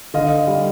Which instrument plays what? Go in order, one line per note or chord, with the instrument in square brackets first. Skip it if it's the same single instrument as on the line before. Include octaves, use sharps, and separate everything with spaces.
[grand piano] D3 D#5 F5
G3